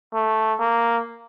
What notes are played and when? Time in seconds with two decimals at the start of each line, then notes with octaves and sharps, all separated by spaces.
0.14 A3
0.60 A#3